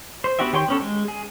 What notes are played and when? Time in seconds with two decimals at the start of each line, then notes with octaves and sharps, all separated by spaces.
0.24 C5
0.39 B3 D4 F#4 G4 E5
0.53 D#3 G4 C#5 G5 C6
0.68 B3 C#4 A4
0.80 G#3
1.08 G#4